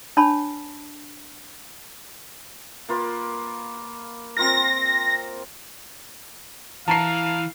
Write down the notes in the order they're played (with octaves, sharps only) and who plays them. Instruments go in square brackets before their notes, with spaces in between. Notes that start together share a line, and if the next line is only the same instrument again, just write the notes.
[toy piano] D4 C#5 A5 B5
[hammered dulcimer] A#3 F4 B4
[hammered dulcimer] C4 F4 A#4 [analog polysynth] A#6
[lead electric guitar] E3 [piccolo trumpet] F5 [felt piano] A5 A#5 C7